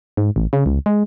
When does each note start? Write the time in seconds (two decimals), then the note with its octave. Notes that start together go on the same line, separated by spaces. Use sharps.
0.17 G#2
0.36 A1
0.53 C#3
0.66 C#2
0.86 G#3